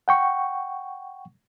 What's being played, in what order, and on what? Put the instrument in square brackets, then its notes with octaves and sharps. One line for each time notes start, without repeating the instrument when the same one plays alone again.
[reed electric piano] F#5 G5 C#6